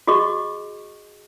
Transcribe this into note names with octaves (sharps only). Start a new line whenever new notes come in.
F#4 G#4 D#5 C#6